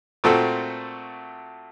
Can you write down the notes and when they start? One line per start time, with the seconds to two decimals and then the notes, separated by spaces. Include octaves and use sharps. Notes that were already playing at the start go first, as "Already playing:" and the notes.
0.24 A#2 A3 C4 F#4 A4